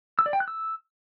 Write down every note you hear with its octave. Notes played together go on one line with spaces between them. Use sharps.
E6
D5
G5
F#6
E6